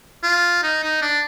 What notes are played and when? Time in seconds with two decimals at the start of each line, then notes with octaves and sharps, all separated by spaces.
0.23 F4
0.63 D#4
0.83 D#4
1.02 D4